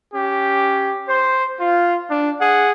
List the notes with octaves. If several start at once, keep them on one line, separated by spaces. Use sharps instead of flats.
C#4 G4
C5
F4
D4
G#4 F#5